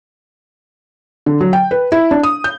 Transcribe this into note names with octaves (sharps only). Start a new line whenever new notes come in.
D3
F#3
G5
B4
E4
D4
D#6
G6